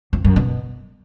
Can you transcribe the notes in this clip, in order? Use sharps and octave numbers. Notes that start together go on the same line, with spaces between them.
F2
F#2
B2